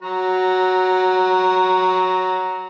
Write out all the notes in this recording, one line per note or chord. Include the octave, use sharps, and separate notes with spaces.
F#3 F#4 A#5